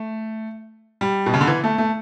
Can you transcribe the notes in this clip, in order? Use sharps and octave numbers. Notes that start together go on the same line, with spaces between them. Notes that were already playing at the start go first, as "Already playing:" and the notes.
Already playing: A3
G3
B2
C#3
D3
E3
A3
A3